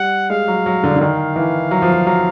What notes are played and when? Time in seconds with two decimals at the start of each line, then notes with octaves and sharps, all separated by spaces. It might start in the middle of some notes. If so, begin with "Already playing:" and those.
Already playing: G3 F#5
0.30 G#3 F5
0.48 F#3
0.66 F#3
0.84 D3
0.96 D3
1.01 D#3 F5
1.36 E3
1.71 F#3
1.82 F3
1.92 F#3
2.07 F#3